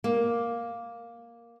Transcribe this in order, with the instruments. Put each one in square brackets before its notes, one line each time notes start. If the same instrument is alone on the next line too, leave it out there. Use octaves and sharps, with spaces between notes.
[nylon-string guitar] A#3